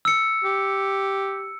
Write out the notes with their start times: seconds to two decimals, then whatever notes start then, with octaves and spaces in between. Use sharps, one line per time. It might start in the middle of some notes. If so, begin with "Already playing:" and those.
0.05 E6 C#7
0.44 G4